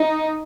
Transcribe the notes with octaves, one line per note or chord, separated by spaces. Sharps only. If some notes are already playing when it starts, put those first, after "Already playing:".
Already playing: D#4